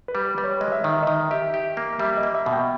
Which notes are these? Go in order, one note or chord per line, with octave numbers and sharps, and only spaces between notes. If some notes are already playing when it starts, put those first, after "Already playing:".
B4
G3
G3 B4
C#5
G#3 D#5
E5
D#3 D#5
E5
D#3 D#5
G4 E5
G4
A#3
G3 E5
D#5
A#3
E5
B2
G5